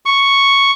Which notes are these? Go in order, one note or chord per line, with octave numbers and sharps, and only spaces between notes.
C#6